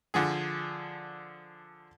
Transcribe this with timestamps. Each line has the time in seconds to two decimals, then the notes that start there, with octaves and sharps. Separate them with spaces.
0.14 D3 F3 G#4